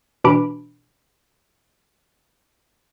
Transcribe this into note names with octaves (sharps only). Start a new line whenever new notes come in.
B2 E3 D4 G4 B5 D7